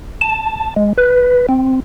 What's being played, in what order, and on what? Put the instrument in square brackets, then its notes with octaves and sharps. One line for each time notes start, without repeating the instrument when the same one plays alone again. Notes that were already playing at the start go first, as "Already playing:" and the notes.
[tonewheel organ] A5
G#3
B4
C4